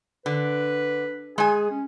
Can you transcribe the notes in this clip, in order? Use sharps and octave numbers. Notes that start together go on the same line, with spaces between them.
D3 B4
G#3 G#4 G#5
C#4